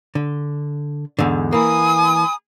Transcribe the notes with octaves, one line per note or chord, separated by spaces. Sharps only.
D3
E2 G#2 D3
E3 A#3 G#5 B5 D#6